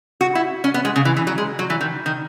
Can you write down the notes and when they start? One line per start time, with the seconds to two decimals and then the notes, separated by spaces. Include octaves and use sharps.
0.21 F#4
0.35 E4
0.64 C#4
0.74 B3
0.85 G#3
0.96 C#3
1.05 E3
1.17 E3
1.27 F#3
1.38 G#3
1.59 F#3
1.70 E3
1.81 D#3
2.06 D#3